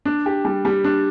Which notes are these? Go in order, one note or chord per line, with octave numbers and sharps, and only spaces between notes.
D4
G4
G3
G3
D4